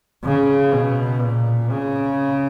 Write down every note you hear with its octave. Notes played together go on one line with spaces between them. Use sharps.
C#3
B2
A#2
C#3